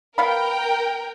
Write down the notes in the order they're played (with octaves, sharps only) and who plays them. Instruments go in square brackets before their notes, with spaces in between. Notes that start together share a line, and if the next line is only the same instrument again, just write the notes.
[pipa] B3 F5 B5 [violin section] A#4 G5